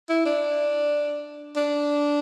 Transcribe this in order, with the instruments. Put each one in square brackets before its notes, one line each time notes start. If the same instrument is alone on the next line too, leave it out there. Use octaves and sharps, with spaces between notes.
[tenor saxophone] E4
D4
D4